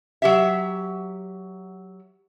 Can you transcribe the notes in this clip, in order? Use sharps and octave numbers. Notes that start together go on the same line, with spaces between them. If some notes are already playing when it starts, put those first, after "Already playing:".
F#3 G4 E5